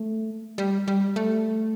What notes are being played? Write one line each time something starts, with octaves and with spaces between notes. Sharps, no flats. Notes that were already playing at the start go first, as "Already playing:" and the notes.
Already playing: A3
G3
G3
A3